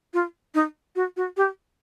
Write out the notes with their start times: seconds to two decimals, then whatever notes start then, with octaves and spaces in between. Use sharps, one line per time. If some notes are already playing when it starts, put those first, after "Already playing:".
0.14 F4
0.55 D#4
0.96 F#4
1.17 F#4
1.37 G4